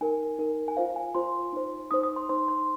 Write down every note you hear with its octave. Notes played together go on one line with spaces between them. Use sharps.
D#4 A#4 G#5
D#4 A#4
G#5
F4 C5 F5
G#5
F4 C5 C6
D#4 C5
D#4 C5 D#6
D#6
C6
D#4 C5 C6
C6